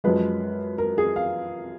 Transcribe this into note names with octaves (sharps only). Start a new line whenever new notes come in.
F#2 F3 G#3 B4
A#4
G#4
F5